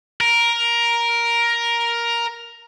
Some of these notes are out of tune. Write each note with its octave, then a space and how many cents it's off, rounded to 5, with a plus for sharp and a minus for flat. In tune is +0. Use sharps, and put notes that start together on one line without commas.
A#4 +10